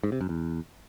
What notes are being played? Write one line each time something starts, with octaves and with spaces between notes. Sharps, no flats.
G#2
C3
F#2
E2